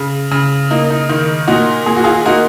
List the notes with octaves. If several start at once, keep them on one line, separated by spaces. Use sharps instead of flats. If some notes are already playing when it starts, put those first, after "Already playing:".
Already playing: C#3
C#3
A#3 D#4
D#4
D#3
A#2 D#4 F#4
A#2 G#4
F#4
F4 G#4
A#3 D#4 F#4